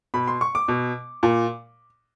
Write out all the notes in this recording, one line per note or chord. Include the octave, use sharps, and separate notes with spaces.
B2 B5
C6
C#6
D6
B2
A#2